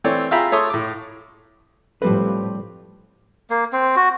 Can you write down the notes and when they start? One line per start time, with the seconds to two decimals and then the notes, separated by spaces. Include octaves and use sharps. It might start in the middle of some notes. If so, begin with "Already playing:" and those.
0.04 E3 A3 C4 C#5 D5
0.31 F4 G#4 E5 G5 A#5 B5
0.52 A3 C#5 E5 A5 C6 D#6
0.70 A2 D6
2.02 A2 F3 G3 A3 C4 G4 B4
3.50 A#3
3.72 C4
3.96 F#4